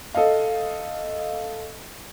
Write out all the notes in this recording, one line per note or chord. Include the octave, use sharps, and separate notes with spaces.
A4 D#5 F5